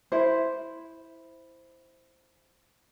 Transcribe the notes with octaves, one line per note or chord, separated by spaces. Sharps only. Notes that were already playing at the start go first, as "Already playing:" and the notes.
E4 C5